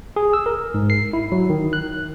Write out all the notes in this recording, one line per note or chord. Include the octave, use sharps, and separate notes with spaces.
G#4
E6
A#4
G#2
C7
E4
F#3
D#3
F#6